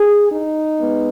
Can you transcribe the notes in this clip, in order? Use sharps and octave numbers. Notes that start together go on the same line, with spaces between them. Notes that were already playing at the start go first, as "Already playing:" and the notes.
Already playing: G#4
D#4
G#3 B3